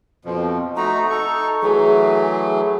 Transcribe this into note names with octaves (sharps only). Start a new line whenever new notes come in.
F2 B2 F3
A3 D#4 F#4 A#5
D#4 A4 C#6
E3 F#3 A3 G#4